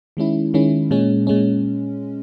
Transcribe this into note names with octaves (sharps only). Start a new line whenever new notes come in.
D#3 G#3 C#4 E4
D#3 G#3 C#4 E4
A#2 G#3 C#4
A#2 G#3 C#4